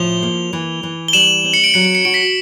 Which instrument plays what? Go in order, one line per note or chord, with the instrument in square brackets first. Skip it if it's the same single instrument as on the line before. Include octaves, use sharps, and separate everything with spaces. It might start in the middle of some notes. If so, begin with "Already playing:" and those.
Already playing: [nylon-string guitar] A2 F3 [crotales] F7 G7
[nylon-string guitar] A#3
E3
E3
[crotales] G7
[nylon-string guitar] G3 [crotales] E7 F#7
[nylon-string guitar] C4
[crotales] C#7
D7
[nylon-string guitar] F#3 [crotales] C#7
[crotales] D7
C#7
[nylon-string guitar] F#4 [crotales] D7
[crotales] B6 C#7